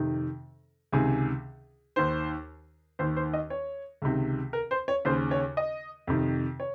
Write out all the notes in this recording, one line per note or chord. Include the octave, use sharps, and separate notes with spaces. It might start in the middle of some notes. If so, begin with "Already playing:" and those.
Already playing: F2 C3 D#3
C#2 C3 D#3 G#4
D#2 D#3 C5
D#2 D#3 C5
C5
D#5
C#5
C#2 C3 D#3
A#4
C5
C#5
D#2 C#3 C5
C#5
D#5
F2 C3 D#3
C#5